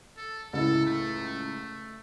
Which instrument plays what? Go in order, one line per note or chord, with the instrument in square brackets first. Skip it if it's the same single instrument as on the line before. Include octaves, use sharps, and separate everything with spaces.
[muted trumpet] A4
[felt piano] C#2 A2 [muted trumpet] A4
[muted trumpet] A3